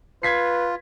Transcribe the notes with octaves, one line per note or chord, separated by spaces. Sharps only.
F4 B4 G#6 B6 C7